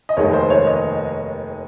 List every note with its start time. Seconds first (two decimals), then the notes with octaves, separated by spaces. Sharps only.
0.09 D#5
0.17 F1 D#2 D#3 G#3 C#5
0.33 C5
0.50 C#5
0.67 D#5